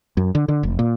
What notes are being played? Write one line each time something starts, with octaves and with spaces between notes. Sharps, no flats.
F#2
D3
D3
F1
A#2